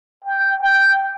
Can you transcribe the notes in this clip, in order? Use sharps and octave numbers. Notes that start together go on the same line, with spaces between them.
G5
G5